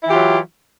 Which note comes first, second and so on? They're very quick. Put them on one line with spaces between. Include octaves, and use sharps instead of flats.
E4 E3 G4 F4 F#3